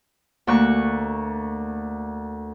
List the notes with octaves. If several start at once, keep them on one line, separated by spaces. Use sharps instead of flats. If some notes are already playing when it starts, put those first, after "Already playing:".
D2 A#3 C#6 F#6